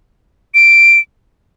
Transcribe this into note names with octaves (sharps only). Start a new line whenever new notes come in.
D7